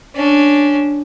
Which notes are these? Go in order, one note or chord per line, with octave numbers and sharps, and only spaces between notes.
C#4 D4